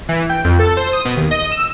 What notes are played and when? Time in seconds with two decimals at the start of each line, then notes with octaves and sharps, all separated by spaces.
0.09 E3
0.30 G5
0.45 F2
0.59 A4
0.77 C5
0.93 D#6
1.05 B2
1.17 D#2
1.31 D#5
1.51 E6